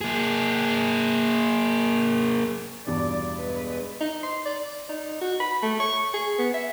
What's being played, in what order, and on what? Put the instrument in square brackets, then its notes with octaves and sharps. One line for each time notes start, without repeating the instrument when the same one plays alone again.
[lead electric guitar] A#3 G#4
[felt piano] E2 G2 B2 [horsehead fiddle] D5
[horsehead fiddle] G#3 B4
[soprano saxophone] D#4
C6
D5
D#4
F#4
B5
A3
C#6
G#4
B3
E5